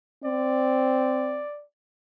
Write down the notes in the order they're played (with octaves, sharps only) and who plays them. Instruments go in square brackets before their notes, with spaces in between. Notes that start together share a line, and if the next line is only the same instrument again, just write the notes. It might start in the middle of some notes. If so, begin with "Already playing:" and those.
[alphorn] C4 [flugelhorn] D5